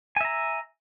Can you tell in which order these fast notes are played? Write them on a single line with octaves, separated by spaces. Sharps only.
G#5 E5 A#5